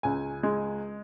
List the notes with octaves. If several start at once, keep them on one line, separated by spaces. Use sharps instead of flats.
C#2 G#5
G#3